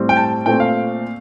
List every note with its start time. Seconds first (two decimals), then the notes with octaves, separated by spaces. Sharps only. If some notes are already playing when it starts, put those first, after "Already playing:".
Already playing: A2 G3 C4
0.09 G5
0.17 A5
0.46 A#2 A3 C4 G5
0.60 F5